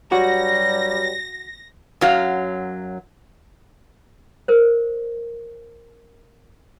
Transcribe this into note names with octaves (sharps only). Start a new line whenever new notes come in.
G2 F#3 G3 F#4 A#6
F#2 F#3 F5
A#4 C5